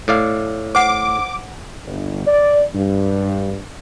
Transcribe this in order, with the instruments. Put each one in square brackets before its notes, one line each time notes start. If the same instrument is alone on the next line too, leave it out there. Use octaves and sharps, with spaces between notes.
[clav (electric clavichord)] A2 D5 F5
[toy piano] C5 F#5 [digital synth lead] D6
[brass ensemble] G1
D5
G2